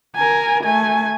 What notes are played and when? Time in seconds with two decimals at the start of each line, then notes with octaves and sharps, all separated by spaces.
0.16 A#4 G#5
0.64 A3 G#5